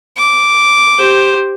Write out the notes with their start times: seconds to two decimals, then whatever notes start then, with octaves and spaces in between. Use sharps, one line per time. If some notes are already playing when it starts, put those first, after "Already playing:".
0.17 D6
0.98 G4 C5